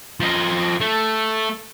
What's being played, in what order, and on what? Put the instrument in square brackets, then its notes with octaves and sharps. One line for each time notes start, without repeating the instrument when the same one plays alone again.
[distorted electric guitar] F3 D#5
A3